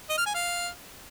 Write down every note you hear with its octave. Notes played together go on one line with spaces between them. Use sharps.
D#5
F6
G#5
F5